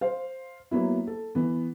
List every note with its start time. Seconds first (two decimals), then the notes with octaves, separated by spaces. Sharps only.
0.01 C5 F5
0.71 F#3 A#3 B3 E4
1.07 A4
1.35 E3 B3